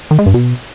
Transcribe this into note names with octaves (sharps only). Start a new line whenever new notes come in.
D#3
G#3
G2
B2